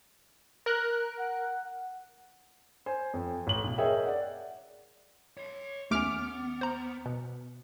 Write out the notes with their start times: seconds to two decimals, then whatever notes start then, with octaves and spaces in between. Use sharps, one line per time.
0.66 A#4 F#6
1.20 F#5
2.86 C5 G#5
3.14 F2
3.47 A1 F#7
3.64 B1
3.78 G#4 A#4 C#5 D#5 E5 G5
4.06 D5 F#5
5.37 C#5 C6
5.91 D#2 A3 B3 C#4 D6 F6
6.61 C5 A#5
7.06 B2